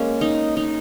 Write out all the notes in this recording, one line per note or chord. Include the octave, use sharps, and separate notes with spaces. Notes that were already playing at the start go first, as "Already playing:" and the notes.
Already playing: G#3 A#3 C#4
D#4
D#4